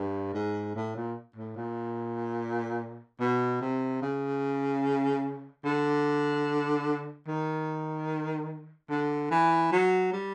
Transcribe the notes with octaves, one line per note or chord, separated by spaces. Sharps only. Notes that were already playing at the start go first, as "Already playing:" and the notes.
Already playing: G2
G#2
A2
A#2
A2
A#2
B2
C3
C#3
D3
D#3
D3
E3
F#3
G3